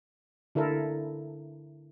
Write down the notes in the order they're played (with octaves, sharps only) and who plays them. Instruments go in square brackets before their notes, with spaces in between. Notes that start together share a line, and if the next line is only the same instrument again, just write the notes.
[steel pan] D3 E4 A4 A#4